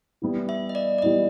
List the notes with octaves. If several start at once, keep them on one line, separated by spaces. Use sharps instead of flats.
E3 G3 B3 E4
E5
D#5
D5
D5
E3 G3 B3 E4 D#5